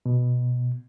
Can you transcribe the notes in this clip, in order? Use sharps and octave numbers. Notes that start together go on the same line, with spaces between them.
B2